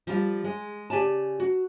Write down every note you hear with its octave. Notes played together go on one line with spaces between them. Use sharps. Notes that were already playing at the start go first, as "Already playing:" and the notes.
F3 G3 F4
G#3
C#3 G4 D5 G#5 A5
F#4